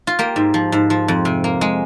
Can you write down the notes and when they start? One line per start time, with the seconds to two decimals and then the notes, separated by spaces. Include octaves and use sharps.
0.07 F4
0.19 A#3 G4
0.36 G#2
0.54 F3
0.72 G#2
0.90 F3
1.08 F2
1.25 C3
1.44 A#3
1.61 G#3